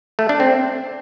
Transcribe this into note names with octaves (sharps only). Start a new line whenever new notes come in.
A3
D4
C4